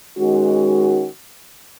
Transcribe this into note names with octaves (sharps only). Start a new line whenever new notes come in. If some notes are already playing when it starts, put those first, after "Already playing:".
D#3 G#3 C#4 F#4